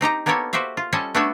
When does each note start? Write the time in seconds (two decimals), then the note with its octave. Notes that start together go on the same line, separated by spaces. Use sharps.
0.01 C4 D#4 G4 A#5
0.26 A#3 B3 G4 A4 A#4 C#5
0.53 F#4 G4 C5 E5 F5
0.77 F4
0.92 G3 C#4 A4 C5 C#5 D#5
1.15 A3 B3 D4 F#4 A4 C#5